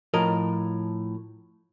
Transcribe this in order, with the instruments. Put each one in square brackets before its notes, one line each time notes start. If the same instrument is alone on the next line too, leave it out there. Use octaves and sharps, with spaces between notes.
[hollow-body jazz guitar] A2 F3 A#4 D#5